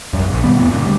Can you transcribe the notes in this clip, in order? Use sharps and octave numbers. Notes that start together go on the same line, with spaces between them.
C2 F#2
A#1
B2 D#3 G3 B3
E1 F2 A2 B3
G1 A#2 C#3
D2 G3